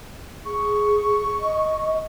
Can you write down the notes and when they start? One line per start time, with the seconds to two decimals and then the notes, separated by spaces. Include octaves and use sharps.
0.45 G#4 C#6
1.40 D#5